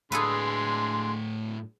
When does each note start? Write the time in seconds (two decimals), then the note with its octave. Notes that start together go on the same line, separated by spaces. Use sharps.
0.12 A2 D3 G#3 G#4 A4 B4 F5 C6